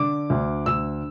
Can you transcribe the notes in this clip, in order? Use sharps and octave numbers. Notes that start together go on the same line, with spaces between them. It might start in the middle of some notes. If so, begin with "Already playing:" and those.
Already playing: D3 D6
D2
D2 E6